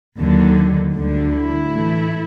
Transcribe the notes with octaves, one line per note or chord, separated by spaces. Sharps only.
D#2 D3 F#3
D2 D3 G3
E4
A2 E3 A3